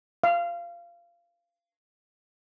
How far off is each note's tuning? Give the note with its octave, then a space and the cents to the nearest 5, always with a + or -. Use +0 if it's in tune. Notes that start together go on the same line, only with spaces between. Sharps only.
F5 -20